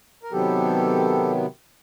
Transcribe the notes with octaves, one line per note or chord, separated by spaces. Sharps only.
A#4
C3 D#3 F#3 B3 G4 A4